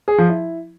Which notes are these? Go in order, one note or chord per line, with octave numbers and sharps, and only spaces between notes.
G#4
F3
E4